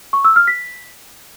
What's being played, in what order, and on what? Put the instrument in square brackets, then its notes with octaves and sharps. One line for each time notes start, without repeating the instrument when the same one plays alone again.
[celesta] C#6
E6
F6
B6